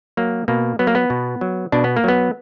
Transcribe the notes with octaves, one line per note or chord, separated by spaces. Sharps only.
F#3 A#3
B2 A#3
F#3 B3
A#3
B3
B2
F#3
B2 D4
B3
A#3
F#3 B3